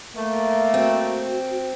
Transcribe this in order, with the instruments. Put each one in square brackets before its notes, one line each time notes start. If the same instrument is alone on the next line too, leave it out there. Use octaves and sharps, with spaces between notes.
[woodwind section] A3 [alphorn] A#3
[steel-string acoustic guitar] C4 [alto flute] F#4